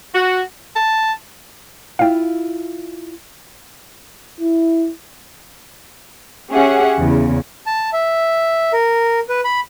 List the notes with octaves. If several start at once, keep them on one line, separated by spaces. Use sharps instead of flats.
F#4
A5
E4 F4 F5 G5
E4
C#4 G4 G#4 C#5 E5 F#5
E2 C#3
A5
E5
A#4
B4
B5